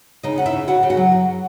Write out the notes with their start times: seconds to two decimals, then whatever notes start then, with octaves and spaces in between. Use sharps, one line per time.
0.23 C#3 D#4 D#5
0.38 C#4 F#5
0.46 E4 E5
0.53 C#3
0.68 C#3 F#4 F#5
0.83 C#3
0.90 F#4 F#5
0.97 F#3
1.12 F#2